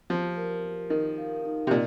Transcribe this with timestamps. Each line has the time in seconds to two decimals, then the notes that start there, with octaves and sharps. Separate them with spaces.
0.09 F3 G4
0.37 A#4
0.63 A#4
0.90 D#3 A#4
1.18 F5
1.45 D#4
1.67 C3
1.71 A#2 D#5